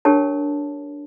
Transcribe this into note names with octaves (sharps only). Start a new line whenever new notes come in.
D4 G4 A#4 C#5 A5